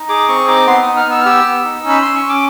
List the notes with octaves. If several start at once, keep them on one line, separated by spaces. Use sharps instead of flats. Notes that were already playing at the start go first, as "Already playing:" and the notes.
Already playing: D#4
G#4 D6
C4 C#6
D#4 D6
B3 C6
D#4 D#6
F6
B3 E6
F6
G4 E6
B3
D#4
C#4
B5
C#4 C6
C#6
C#4
D6